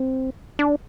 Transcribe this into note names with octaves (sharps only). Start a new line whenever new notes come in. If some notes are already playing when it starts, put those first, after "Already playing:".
Already playing: C4
D4